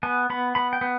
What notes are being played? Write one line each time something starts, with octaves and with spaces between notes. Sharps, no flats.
B3 G#5
B3 B5
B3 B5
G5
B3